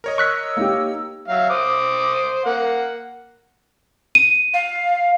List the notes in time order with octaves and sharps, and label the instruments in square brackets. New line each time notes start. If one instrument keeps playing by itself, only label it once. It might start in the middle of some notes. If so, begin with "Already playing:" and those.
[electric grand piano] A#4 C#5 D#5
[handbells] C#6 F#6 B6 [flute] E6
[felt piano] A#3 D#4 G4
[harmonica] F#3 E5 F5
C5 D6 D#6
A#3 F#5
[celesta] D#7
[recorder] F5